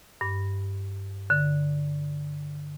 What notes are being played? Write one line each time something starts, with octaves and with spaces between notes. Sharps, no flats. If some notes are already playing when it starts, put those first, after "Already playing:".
G2
D3